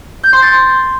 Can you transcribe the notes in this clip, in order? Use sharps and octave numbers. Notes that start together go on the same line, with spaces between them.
G6
C6
A6